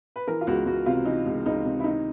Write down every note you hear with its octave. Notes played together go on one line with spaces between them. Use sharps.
B4
E3 A#4
F4
C#2 F#4
C#2 F#4
C3 F4
E3 D#4
C#2
C#2 D#4
C3
E4
D#3 D#4